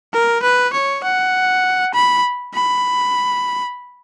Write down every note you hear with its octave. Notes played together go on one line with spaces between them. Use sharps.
A#4
B4
C#5
F#5
B5
B5